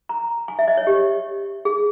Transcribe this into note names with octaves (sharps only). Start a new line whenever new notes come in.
A#5
G#5
E5
D#5
C#5
G4
G#4